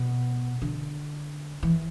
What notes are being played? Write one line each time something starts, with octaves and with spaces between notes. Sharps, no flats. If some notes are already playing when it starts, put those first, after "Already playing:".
Already playing: B2
D3
E3